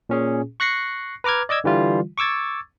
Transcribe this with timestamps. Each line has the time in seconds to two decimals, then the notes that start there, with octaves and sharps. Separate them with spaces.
0.09 A#2 C#4 G#4
0.60 C#6 F#6 A#6 C7 C#7
1.24 B4 A#5 D6 F6 G#6
1.49 D5 D#5 D6 E6 G#6
1.64 D3 E3 G3 F4
2.18 C#6 D6 E6 G#6 A6